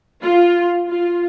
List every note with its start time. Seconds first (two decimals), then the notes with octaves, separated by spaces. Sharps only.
0.22 F4
0.88 F4